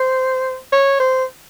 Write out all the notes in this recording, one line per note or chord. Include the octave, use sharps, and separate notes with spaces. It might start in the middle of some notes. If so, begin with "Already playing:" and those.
Already playing: C5
C#5
C5